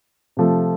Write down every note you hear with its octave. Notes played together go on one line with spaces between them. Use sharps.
C3 F3 A3